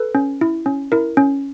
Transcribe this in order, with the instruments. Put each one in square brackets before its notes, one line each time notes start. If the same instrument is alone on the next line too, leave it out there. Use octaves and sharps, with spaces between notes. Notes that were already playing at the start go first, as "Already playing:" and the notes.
Already playing: [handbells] A4 B4
C#4
E4
C#4
E4 A#4
C#4